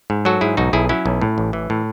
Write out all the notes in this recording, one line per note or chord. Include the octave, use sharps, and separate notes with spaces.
G#2
F#3 F#4 A4
G#2 E4 G#4
B1 D#4 F#4
B1 E4 G#4
F#3 C#4 E4
B1
A2
A1
E3
A2